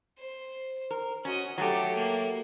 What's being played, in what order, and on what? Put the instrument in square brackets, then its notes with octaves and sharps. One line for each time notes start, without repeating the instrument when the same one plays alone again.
[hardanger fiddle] C5
[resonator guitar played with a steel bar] A#4
[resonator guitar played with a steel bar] C#4 [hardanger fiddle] F#4 D#5
[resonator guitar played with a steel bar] F#3 A3 G4 [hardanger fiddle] A4
[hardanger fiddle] A#3